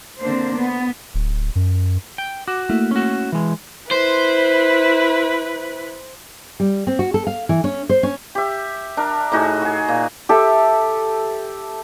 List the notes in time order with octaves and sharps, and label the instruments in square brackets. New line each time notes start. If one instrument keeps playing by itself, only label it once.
[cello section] D3 A#3 C4 D4 C5
B3
[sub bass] D1
F#2
[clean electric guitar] G5
[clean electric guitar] F#4 [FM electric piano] D6
[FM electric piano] A3 A#3 E4
[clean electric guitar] C#4 F#4
E3 G#3
[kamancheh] E4 B4 [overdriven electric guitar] C5
[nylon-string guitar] G3
C4
F#4
A4
F5
E3
C#4
C5
C#4
[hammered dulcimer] G4 E5
D4 A#4
A2 D#4 F#4 G#4
F#4 G#4
A#2
[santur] G4 A4 E5